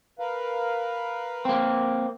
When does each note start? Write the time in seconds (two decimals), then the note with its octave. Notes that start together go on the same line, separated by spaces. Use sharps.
0.19 A#4 B4 F5
1.45 A#3 C4